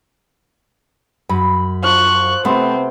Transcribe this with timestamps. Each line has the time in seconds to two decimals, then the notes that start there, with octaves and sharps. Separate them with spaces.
1.29 F#2 B5
1.84 F3 C#6 F#6
2.45 C3 A3 B3 C4 C6